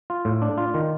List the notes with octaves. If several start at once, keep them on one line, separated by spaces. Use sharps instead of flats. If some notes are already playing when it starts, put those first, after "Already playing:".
F4
A2
D4
F4
D#3